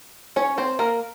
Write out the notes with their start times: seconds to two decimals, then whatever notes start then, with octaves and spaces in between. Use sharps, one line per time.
0.36 C#4 C#5
0.58 C4 C5
0.79 A#3 A#4